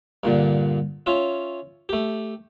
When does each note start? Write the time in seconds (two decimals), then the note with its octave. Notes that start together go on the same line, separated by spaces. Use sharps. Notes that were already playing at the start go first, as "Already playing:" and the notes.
0.24 G2 A#2 D3
1.06 C#4 F4 E5
1.89 A3 G4